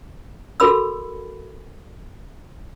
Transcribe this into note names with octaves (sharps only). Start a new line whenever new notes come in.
F#4 A4 A#4 B5 E6